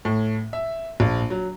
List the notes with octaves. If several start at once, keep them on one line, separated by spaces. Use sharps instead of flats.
A2
E5
A#1
F#3